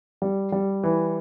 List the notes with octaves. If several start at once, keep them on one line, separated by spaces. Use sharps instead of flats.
G3
G3
E3